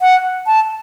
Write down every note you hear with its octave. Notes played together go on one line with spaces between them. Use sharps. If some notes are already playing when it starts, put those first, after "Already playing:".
F#5
A5